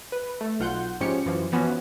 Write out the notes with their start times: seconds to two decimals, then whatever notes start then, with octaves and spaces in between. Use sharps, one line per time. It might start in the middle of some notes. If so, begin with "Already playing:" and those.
0.12 B4
0.41 A3
0.60 B1 F4 F#5 G6
1.00 G#2 F3 C#4 G4 C#7
1.25 F#2 E3 F3
1.52 E3 F3 B3 C#4 F#4